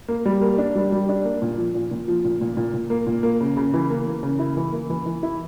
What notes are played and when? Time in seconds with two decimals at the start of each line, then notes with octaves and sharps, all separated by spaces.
0.08 A#3
0.26 G3
0.41 A#3
0.58 D4
0.75 G3
0.92 G3
1.09 D4
1.25 A#3
1.42 A#2
1.58 F3
1.75 A#2
1.91 A#2
2.08 F3
2.25 A#2
2.41 A#2
2.57 A#2
2.74 A#2
2.90 A#3
3.07 A#2
3.23 A#3
3.40 C#3
3.57 C#3
3.74 E3
3.90 A#3
4.07 A#3
4.23 C#3
4.39 E4
4.57 E3
4.72 A#3
4.90 E3
5.06 E3
5.23 E4